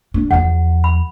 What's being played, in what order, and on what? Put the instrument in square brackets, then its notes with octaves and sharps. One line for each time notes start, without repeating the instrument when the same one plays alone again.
[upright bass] D4
[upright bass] E2 F3 [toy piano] F#5
[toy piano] B5